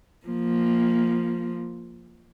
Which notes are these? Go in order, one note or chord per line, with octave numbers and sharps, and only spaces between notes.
F3 A#3